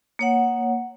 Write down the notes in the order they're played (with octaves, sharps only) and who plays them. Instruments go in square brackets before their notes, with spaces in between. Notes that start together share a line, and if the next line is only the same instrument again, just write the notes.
[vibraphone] A#3 C#5 F#5